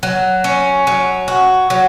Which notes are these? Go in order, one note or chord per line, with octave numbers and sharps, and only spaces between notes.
F#3
C#4
F#3
F#4
F#3